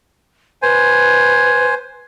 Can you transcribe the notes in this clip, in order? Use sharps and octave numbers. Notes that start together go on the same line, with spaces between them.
B4 C5 G#5